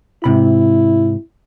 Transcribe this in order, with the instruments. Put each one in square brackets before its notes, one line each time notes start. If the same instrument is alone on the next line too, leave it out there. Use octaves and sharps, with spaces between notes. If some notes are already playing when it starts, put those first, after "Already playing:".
[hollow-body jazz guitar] G#2 C3 B5 [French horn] E4